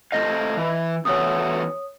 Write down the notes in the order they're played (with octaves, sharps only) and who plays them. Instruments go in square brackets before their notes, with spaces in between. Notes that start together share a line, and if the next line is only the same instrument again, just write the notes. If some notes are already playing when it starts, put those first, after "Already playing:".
[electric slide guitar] A3 C5 F5 [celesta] D#5 A#6
[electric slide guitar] E3
[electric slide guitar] E2 A3 F#4 [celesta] C#5 D#6